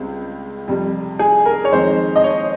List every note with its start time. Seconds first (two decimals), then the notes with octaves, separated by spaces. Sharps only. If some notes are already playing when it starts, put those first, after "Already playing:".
Already playing: C#2 C#3 G3 C4
0.67 F2 C3 G3
1.19 G#4
1.45 A#4
1.65 C#5
1.72 F2 D#3 G#3 C4 C5
2.16 D#5
2.24 C#5